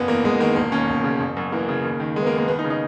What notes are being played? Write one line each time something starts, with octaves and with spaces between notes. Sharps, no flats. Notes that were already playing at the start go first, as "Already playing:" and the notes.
Already playing: F#1 B3
E2 A#3
F#1 G#3
D#3 A#3
E1 A#3
D#2 C#4
E1
C#3
F#1
F#2
E3 A#3
C#3
D#2
D#3
D#3 G#3
B3
A#3
D#2
A#3
D#2 B3
D#4
C#3
D#4